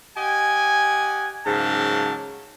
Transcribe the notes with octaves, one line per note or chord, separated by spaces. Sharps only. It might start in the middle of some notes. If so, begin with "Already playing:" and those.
G4 D#5 F#5 G#5
G#2 C#3 F#3 A#3 A5